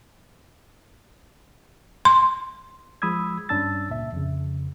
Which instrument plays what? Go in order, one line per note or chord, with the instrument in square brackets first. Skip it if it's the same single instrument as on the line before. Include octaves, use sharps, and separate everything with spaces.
[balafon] C6
[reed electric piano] F3 G#3 B5 D#6 E6 G#6
G2 C#4 D4 A5 E6 A6
C#2 A#2 E5
F2 C#3